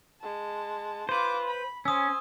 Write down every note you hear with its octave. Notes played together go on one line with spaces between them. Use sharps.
G#3 A5
F4 B4 C5 D6
B5
C#4 C5 G#5 D#6 E6